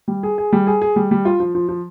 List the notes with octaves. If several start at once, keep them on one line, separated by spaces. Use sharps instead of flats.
G3
G#4
G#4
G3
G#4
G#4
G3
G3
F4
F3
F3
F3